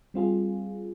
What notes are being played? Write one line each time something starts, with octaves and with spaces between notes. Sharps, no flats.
G3 C4 F4 G#4